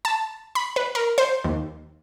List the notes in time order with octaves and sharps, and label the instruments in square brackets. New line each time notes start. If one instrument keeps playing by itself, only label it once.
[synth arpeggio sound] A5
B5
B4
A#4
C5
D#2